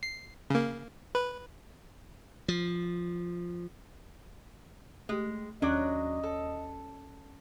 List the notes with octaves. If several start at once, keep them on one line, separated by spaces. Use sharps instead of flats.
C7
C#3 A#3
B4
F3
G#3 A3 G4
D#2 F#3 C#4 D4 D5 D#5
A4